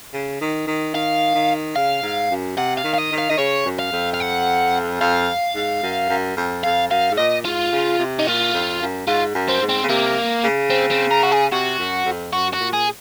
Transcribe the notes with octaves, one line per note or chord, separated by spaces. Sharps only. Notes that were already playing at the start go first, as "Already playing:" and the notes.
C#3
D#3
D#3
D#3 F5
D#3
C#3 F5
G#2
F#2
C3 F#5
F5
D#3
F5
D#5
D#3
F5
D#3 D#5
C#3 C#5
F#2
F5
F2
F5
F#5
F2 F5
G#2
F#2
F#2
F2
F2 F5
F#2 F5
G#2
A#2 D#5
G#2 F4
C#3
C3
D#4
A#2 F4
F2
F#2
G#2 F4
F#2
C4
G#2
C4
C#3
C3 A#3
C#3
C4
C4
A#4
F#4
G#4
C3 F#4
F#2
F2
F#2 F#4
F#4
A#2
G#4